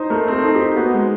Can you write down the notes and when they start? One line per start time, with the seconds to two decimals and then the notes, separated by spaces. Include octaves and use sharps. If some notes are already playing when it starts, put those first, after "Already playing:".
Already playing: D#4 C5
0.10 A3 A#4
0.28 C4 A4
0.44 D#4
0.55 G4
0.61 D#4
0.76 B3 F#4
0.94 G#3